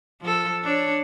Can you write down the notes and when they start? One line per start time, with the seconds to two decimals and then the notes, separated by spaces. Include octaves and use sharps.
0.22 F3 A4
0.63 D4 C#5